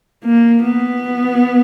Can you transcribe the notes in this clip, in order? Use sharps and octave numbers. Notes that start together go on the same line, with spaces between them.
A#3
B3